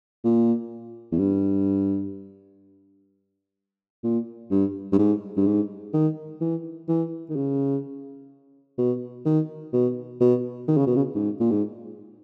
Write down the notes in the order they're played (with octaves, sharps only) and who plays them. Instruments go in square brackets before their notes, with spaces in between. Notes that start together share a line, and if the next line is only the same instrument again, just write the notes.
[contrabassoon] A#2
E2
G2
A#2
G2
G2
G#2
G2
G#2
D#3
E3
E3
D#3
C#3
B2
D#3
B2
B2
D#3
C#3
B2
C#3
G#2
A#2
G#2